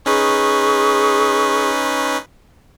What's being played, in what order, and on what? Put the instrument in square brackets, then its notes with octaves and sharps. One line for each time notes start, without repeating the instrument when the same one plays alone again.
[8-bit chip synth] C#4 D#4 B4 [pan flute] G#4 [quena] C#6